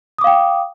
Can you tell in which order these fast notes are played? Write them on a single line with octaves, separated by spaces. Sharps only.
D#6 D6 F5 G5